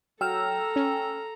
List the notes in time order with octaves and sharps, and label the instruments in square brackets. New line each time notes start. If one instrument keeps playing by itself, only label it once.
[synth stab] F#3 [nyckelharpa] A4 A#5 [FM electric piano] G5 E6 F6
[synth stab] C#4